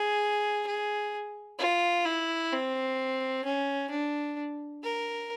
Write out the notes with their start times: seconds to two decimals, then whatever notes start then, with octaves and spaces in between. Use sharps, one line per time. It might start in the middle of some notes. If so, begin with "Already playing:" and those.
Already playing: G#4
0.67 G#4
1.59 F4
2.05 E4
2.52 C4
3.45 C#4
3.90 D4
4.83 A#4